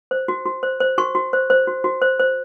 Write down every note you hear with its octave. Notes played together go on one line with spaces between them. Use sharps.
C5
F#4
F#4
C5
C5
F#4 C#6
F#4
C5
C5
F#4
F#4
C5
C5